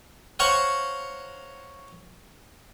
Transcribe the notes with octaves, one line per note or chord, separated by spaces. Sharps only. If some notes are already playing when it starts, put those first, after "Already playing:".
C5 C#5 F5 F#5 A#5 C#6